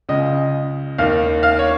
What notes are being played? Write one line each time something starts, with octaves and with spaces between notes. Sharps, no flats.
C#2 C#3 D#5
D#2 D#3 F5
F5
C#5